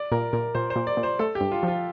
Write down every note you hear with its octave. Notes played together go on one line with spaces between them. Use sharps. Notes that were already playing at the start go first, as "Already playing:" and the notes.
Already playing: D5
A#2 A#4
A#2 A#4
A#2 C5
C5
A#2
D5
A#2
C5
A3 A4
G4
G2
F4
F3
F4